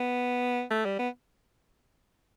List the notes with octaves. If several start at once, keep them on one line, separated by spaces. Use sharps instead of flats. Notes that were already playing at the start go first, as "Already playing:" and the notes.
Already playing: B3
A3
G3
B3